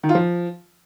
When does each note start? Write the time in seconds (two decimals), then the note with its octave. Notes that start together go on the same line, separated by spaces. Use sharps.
0.03 D#3
0.09 F4
0.15 F3